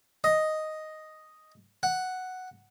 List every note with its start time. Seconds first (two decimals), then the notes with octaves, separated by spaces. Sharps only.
0.24 D#5
1.83 F#5